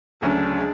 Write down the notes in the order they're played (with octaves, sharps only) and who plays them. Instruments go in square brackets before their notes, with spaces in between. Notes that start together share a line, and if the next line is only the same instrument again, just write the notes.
[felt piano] D2 C#3 F#3 C#4 [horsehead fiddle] D4
[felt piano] G#3